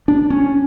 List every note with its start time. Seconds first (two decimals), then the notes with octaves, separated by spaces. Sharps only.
0.08 D4
0.30 C#4